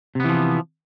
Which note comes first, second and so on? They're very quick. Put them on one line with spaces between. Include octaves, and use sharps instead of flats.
C3 B3 E3 F3